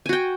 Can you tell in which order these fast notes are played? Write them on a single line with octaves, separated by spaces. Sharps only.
G#5 F#4 G5